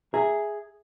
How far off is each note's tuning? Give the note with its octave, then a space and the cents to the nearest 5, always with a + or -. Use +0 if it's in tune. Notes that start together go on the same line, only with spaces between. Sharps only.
G#4 +0 E5 +0 A#5 -20